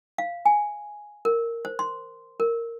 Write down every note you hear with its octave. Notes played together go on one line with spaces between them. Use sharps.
F5
G#5
A#4
C5
C6
A#4